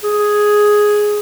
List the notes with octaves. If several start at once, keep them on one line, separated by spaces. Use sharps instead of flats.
G#4